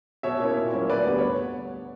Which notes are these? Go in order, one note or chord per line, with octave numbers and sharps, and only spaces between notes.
B2 C#5 E5
A#3 C#4 E4
A#2
F#3 A#3 C#4
D2 B4 D5
D3 G3 B3
C#5